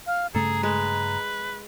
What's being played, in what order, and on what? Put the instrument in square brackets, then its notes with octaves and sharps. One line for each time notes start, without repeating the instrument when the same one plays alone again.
[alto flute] F5
[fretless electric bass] G2 C#3 A3 [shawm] G#4 [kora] A4 [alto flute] A#5
[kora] G#3 [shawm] B4